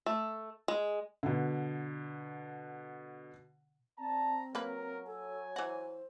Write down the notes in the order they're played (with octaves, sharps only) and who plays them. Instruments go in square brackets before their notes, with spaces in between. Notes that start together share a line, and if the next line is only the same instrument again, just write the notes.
[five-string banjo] A3
G#3
[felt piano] B2 D3
[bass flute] C4 [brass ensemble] D5 A5 [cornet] A#5
[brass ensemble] F#3 [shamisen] A#3 B4 [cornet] A#4
[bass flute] A4 [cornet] G#5
[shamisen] E3 F#4 [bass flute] C5